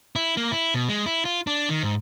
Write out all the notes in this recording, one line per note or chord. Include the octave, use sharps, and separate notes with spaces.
E4
A#3
E4
B2
G#3
E4
F4
D4
D#3
G#2